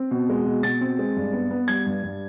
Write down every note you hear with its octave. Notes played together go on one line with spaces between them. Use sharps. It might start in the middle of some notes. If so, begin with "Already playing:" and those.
Already playing: C4
B2
G#3
B2
B2 A6
C4
G#3
G2
B3
B3
G3 G#6
G2
G2